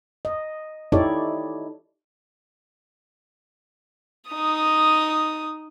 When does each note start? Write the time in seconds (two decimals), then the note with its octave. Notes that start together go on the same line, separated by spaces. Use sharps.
0.25 D#5
0.92 D#4 E4 G4 A4 C#5 D5
4.29 D#4 D#6